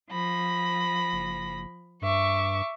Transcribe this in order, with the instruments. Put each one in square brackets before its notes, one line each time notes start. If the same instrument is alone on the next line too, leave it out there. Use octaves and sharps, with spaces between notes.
[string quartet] F3 B5 A#6
[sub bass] F#1
[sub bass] G2 [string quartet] E5 C#6 D6